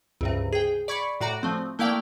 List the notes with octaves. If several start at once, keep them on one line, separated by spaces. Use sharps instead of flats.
C#2 G2 C3
G#4 G5
D5 B5 C#6 G#6 B6 C#7
A2 F#4 D5 A#5
F3 A3 C4
A3 A#3 E4 D5 F5 G5